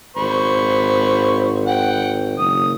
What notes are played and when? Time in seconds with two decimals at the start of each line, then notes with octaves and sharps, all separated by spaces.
0.17 G#1 C5 B5 C#6
1.66 F#5 G5
2.39 F#1 D#6